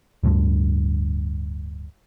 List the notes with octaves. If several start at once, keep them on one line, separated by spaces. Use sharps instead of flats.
D1 D2 G2 D3